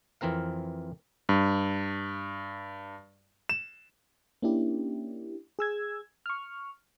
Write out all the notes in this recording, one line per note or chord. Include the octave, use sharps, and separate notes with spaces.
F2 E3 C4 A#4 F5
G2
E7
A#3 C#4 D4 E4 G4
G#4 E6 G#6
C#6 F6